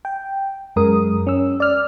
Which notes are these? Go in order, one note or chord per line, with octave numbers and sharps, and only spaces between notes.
G5
F#2 G#3 A#4 D#6
C#4 E6
D5 F6